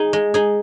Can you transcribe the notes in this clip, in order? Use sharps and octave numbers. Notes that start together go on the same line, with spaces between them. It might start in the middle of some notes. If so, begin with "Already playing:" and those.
Already playing: D#4 G#4
G#3
D#4 G#4